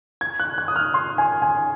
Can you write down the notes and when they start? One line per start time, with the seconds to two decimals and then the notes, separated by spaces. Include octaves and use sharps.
0.21 G#6
0.40 F#6
0.58 F#6
0.68 D#6
0.76 F6
0.94 C6
1.18 G#5
1.42 G#5